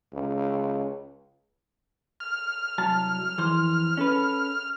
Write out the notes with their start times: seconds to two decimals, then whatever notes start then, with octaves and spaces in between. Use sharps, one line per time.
0.13 C#2
2.20 F6
2.78 C2 F#3 A5
3.38 F2 E3 C5
3.97 C#4 A4 B4